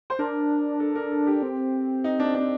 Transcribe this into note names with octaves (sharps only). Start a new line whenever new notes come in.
C5
D4 A#4
A4
A#4
A4
G4
C4
D#4
D4
D4